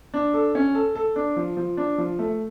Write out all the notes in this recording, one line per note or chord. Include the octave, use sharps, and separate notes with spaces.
D4
A4
C#4
A4
A4
D4
F3
F3
D4
F3
A3